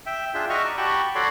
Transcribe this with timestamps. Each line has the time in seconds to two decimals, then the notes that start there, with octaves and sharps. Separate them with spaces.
0.06 E5 G5
0.34 D4 F4 G#4 E5 G5
0.50 F#4 D#5 E5 C#6 F6
0.64 D5 A#5
0.77 F#4 G4 G5 A5 B5 C#6
1.15 F#4 A4 C#5 D5 B5 C6